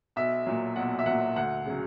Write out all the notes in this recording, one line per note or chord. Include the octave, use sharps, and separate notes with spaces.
B1 E5
A#2 F#3
B1 F#5
E5
A#2 F#3 F#5
D2 F#5
C#3 F#3